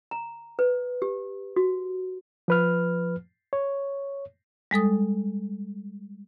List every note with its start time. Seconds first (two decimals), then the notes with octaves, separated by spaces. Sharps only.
0.11 A#5
0.59 B4
1.02 G4
1.56 F#4
2.48 F3 B4 F6
3.53 C#5
4.71 G3 G#3 A4 D#6